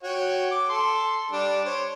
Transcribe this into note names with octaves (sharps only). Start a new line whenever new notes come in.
F#4 C#5 G5
D6
A4 C6
G3 D4
C5 C#5